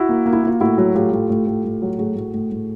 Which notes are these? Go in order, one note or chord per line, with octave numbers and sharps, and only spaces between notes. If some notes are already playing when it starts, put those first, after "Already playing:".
Already playing: E4 F#4
A#3
A#3
E4
A#3 F4
A2 E4 F#4
F#3
A2 F4 G4
A2
A2
A2
A2
F#3
A2 F#4 G#4
A2
A2
A2